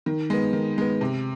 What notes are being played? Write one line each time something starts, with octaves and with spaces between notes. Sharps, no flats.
D#3
G#3 B3
D#3
G#3 B3
C3